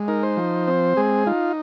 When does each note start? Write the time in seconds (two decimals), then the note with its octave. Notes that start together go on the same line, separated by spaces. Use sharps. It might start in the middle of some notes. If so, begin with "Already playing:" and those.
Already playing: G#3
0.08 D#4 A#4
0.23 C5
0.37 F3
0.67 C4
0.97 G#3 G#4
1.26 D#4 F4